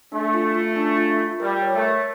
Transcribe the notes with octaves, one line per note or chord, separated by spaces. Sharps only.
A3 D4
F4
F4
D4
F4
F4
G3 A#4
C#5
A3
A#4